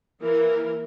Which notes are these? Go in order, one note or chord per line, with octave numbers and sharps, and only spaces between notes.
E3 A#3 A#4